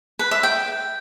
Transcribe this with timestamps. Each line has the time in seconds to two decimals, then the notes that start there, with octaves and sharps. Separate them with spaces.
0.19 B4
0.31 E5
0.43 G5